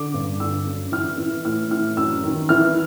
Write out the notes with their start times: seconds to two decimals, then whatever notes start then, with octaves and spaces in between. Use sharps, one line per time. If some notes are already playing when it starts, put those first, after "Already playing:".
Already playing: D3 D6
0.14 G2
0.40 D3 E6
0.67 F#2
0.92 E3 F6
1.18 E3
1.45 A2 F6
1.71 E3 F6
1.97 F#2 E6
2.24 D#3
2.49 E3 F6